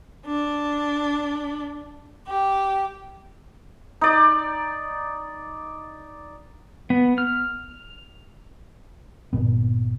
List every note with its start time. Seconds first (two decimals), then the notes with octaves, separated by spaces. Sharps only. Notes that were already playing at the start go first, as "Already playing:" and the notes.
0.25 D4
2.26 G4
4.01 D#4 D5
6.90 B3
7.18 F6
9.33 G1 A#2 B3